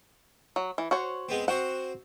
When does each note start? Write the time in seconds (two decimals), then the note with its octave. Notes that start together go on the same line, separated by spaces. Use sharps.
0.56 F#3
0.78 E3
0.91 F#4 C5 C#5
1.29 G#3 B3 C4
1.48 C4 F#4 C5 F#5